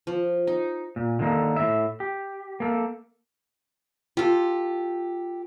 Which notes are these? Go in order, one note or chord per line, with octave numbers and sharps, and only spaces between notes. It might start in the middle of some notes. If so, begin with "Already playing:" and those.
F3
D#4
A#2
D3 D#3 A#3 A4
A2 E5
G4
A#3 A4
F4 G4 A4